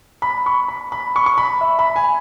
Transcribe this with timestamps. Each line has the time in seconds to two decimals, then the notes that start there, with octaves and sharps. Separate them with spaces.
0.22 B5
0.46 C#6
0.68 B5
0.92 B5
1.16 C#6
1.26 C#6
1.38 B5
1.61 E5
1.79 B5
1.96 G#5